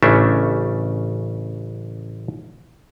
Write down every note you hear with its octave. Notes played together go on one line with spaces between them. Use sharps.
A1 C#3 A3 C#4 D4 E5